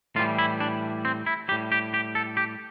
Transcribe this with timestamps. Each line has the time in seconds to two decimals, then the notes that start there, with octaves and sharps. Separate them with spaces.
0.16 A2 E3 G3 F4
0.39 E4
0.60 D4
1.05 C4
1.26 E4
1.48 G3 G4
1.52 A2
1.72 G4
1.94 G4
2.15 A4
2.37 G4